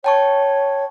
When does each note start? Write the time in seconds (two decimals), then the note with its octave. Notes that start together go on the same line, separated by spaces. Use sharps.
0.04 C#5 G5 A5 C#6